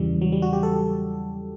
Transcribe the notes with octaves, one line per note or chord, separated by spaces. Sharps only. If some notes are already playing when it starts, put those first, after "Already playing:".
Already playing: E2 C#3 E3 G3
F#3
G3
F#4
G4
A4